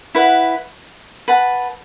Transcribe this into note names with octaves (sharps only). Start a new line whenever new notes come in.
E4 B4 F#5
B4 F#5 A5